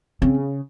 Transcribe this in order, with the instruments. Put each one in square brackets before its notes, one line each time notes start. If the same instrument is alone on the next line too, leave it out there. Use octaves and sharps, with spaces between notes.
[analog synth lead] C#3 [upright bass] C4